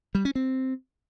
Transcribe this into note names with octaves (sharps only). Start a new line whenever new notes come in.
G3
C#4
C4